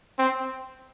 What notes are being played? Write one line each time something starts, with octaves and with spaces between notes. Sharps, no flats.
C4